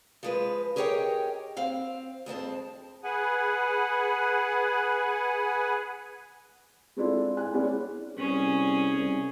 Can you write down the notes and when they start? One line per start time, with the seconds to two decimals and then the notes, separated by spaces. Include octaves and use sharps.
0.23 F3 G#3 B4
0.76 G4 G#4 A#4 C#5 D#5 G5
1.57 C4 F5
2.26 F2 G#3 C4 A5
3.04 G#4 B4 F#5 G#5
6.97 G#3 C4 D4 E4 F4 A4
7.37 G#5 F#6
7.53 G#3 B3 C#4 D4 E4
8.18 C2 C#4 G#4
8.93 C2